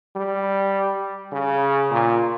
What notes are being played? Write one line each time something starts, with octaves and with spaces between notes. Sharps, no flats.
G3
C#3
A#2